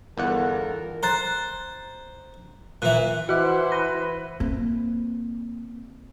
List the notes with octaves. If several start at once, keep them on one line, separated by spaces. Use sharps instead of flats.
G1 E2 F4 A4 A#4 F#5
C5 A#5 F#6 A6
A#2 E3 F#6
E3 E4 F#4 C5 F#5 D6
B4 A#6
A#3 C4